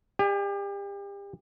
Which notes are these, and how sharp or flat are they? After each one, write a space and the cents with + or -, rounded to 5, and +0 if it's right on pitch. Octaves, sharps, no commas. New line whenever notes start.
G4 +35 D5 +35 G#5 +0